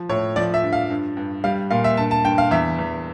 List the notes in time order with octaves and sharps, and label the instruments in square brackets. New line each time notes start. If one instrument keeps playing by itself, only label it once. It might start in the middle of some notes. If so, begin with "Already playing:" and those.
Already playing: [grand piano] F3
A2 C#5
F3 D5
E5
G2
F5
G2
G2
G3 F5
A#2 F5
E5
G2 A5
A5
G2 G5
F5
E2 E5
E2